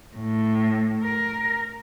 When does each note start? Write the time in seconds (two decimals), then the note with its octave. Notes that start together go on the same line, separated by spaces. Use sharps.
0.16 A2
1.03 A#4